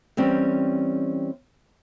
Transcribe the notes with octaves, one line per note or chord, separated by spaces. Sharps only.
E3 G3 C4 C#4